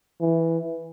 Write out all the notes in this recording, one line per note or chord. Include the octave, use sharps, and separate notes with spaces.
E3